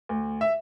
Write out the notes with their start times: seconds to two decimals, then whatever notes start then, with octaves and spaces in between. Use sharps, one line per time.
0.09 D2
0.41 E5